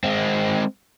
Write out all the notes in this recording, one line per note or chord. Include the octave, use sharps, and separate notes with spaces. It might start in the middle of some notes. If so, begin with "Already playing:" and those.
G#3 C4